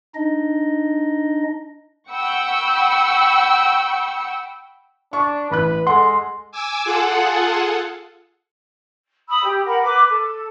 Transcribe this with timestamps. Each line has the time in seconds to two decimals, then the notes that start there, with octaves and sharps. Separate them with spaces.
0.15 D4 D#4 D#5
2.11 F#5 G5 B5 C#6 E6
5.13 D4 C#6
5.51 A1 B4 B5 F#6
5.87 G#3 A4 F#5 C6
6.51 G#5 D6 E6
6.84 F4 G#4 A4 F#5
9.29 B5 D#6 E6
9.44 G4
9.66 A#4 F#5 B5
9.82 B4 D6
10.10 A4